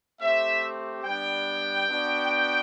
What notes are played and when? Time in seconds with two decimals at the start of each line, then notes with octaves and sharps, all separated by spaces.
0.20 A3 C4 G4 E5
1.04 G3 B3 D4 G5
1.88 B3 D4 F#4